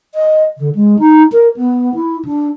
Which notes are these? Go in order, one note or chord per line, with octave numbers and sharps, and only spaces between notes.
D#5
D3
G#3
D#4
A#4
B3
E4
D4